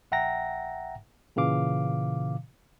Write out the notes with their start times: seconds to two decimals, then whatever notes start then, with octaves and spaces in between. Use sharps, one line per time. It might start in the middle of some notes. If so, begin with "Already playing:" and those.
0.12 A#1 E5 F#5 G5 A#5 A#6
1.36 A#2 C#3 E3 F5 D6